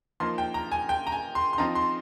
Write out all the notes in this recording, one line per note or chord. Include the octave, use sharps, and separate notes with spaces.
F3 A#3 D#4 C6
G5
A#5
G#5
G5
A#5
G#5
C6
C6
F3 C4 D#4 A#5
C6